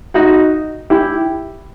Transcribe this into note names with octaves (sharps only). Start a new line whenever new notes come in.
D#4 F#4
E4 G4